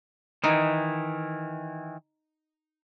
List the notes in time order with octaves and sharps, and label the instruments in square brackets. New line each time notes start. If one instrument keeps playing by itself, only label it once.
[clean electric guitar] D#3 E3 [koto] D#4 G#5